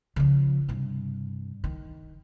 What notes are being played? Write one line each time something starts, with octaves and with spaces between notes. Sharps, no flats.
C#3 F3
G2 C3
D#3